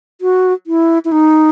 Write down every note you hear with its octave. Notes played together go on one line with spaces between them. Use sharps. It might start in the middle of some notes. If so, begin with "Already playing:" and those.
F#4
E4
E4
D#4